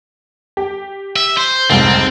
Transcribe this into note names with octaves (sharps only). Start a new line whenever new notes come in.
G4
E5
C5
F1 C2 G#2 C4